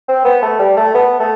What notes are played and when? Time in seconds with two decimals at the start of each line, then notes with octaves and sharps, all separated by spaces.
0.08 C4
0.25 B3
0.42 A3
0.59 G3
0.77 A3
0.95 B3
1.20 A3